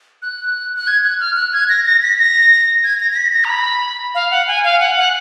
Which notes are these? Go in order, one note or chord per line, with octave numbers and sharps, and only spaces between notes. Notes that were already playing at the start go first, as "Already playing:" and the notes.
F#6
F#6
G#6
F#6
F6
F#6
G#6
A#6
A#6
B6
A#6
G#6
A#6
A#6
B6
A#6
A#5
B5
F5
F#5
G#5
F5
F#5
F#5